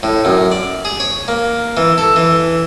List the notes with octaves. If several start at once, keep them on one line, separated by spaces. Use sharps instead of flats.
A2
F#2
D5
G#4
C#5
A#3
E3
A4
E3